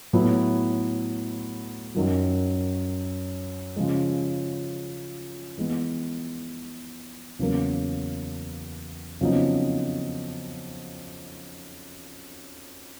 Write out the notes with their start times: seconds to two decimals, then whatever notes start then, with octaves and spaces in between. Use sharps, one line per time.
0.13 A2 F#3 B3 E4
1.95 F#2 D#3 F#3
3.76 C#3 F3 G#3
5.58 E3 G#3 B3
7.39 E2 C#3 F#3 A#3
9.21 F2 C#3 F#3 B3 D#4